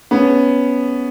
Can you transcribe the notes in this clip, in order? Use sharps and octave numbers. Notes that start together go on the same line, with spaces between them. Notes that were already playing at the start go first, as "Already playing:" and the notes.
B3 C#4